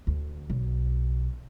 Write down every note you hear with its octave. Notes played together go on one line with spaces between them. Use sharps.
D2
B1